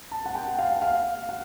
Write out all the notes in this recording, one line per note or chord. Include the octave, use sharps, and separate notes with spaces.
A5
F#5
G5
F5
F5
F#5